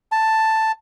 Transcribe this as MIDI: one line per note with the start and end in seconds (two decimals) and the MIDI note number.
0.12 0.72 81